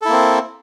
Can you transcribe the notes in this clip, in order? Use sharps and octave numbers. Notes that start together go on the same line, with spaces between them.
A#3 C4 E4 A4